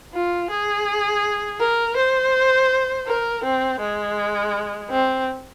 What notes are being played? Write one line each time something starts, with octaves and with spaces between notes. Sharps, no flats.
F4
G#4
A#4
C5
A#4
C4
G#3
C4